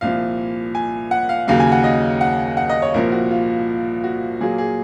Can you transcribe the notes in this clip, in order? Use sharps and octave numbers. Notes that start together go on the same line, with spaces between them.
C2 A#2 F3 F5
G#5
F#5
F5
D#2 C#3 F#3 A#3 F5
G#5
F#5
D#5
F#5
F#5
D#5
C#5
C2 A#2 F3 A#4
F#4
F4
F#4
A#2 F#3 A#3 G#4
G#4